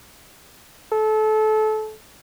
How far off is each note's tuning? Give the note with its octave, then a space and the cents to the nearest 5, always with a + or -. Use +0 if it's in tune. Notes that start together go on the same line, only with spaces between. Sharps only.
A4 -25